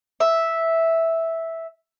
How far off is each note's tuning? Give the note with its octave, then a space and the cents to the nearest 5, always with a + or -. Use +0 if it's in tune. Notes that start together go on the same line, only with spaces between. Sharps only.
E5 -5